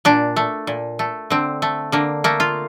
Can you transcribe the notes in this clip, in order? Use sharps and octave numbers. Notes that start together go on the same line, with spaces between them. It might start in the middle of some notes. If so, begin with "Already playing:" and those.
A#2 D4
A3
A#2
A3
D3 C4
A3
D3 A#3
A3 A#3
F4